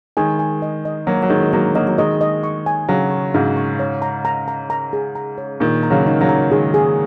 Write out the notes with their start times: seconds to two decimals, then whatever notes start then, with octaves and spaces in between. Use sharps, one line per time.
0.17 D#3 G#3 G#5
0.39 G#5
0.62 D#5
0.85 D#5
1.07 F#3 A#3 F#4
1.22 F#3
1.29 D#3 G#3 D#5
1.42 G#3
1.53 F#3 A#3 F#4
1.75 F#3 A#3 D#5
1.88 F#3
1.98 D#3 G#3 D#5
2.21 D#5
2.43 C#6
2.66 G#5
2.88 C#3 F#3 F#4
3.11 C#6
3.34 G#2 C#3 F#4
3.57 C#6
3.79 C#5
4.02 A#5
4.25 A#5
4.48 A#5
4.70 A#5
4.93 G#4
5.15 A#5
5.38 C#5
5.60 A#2 D#3 G#4
5.83 A#5
5.90 C#3 F#3
6.06 D#4
6.21 C#3 F#3
6.29 A#5
6.51 D#3 G#3 G#4
6.74 G#4